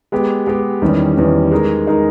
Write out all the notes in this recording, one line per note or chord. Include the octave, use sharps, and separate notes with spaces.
G#3 B3 G4
G#3 B3 G4
E2 D#3 G3 C#4
E2 D#3 G3 C#4
G#3 D#4 A#4
G#3 D#4 A#4